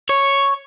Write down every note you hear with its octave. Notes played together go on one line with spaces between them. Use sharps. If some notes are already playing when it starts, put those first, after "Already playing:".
C#5